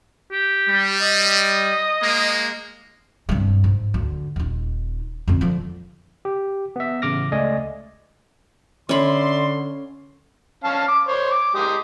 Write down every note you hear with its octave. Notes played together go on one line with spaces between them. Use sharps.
G4
G3
D#5
G#3 A#3
G2 C3
G#2
D2
D#1 D#4
F2 D3
D3 F3
G4
B3 E5
A1 C#3 D6 F6 A#6
C#2 A3 D5 D#5 G#5
D3 C#4 D5 E5 B5 C6
C#4 F5 A5
D6
C5 C#5 C6
D6
G#3 G4 D#6